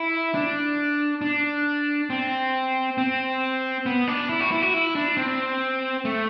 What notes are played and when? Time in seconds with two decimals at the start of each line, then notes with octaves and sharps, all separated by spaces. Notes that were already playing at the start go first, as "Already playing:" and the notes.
Already playing: E4
0.34 D4
1.22 D4
2.10 C4
2.98 C4
3.86 B3
4.08 D4
4.29 E4
4.40 F#4
4.51 E4
4.62 F#4
4.74 E4
4.95 D4
5.17 C4
6.05 A3